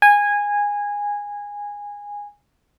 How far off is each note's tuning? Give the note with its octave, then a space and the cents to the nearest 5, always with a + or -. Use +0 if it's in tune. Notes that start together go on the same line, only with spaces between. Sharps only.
G#5 -15